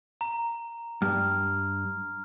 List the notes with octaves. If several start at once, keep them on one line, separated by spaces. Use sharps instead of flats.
A#5
G2 F6